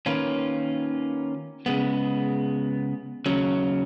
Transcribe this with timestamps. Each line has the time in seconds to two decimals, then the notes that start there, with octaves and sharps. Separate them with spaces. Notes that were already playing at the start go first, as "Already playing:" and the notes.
0.06 D#3 A#3 C#4 F4 B4
1.66 C#3 G#3 B3
3.26 D#2 C#3 F#3 C#4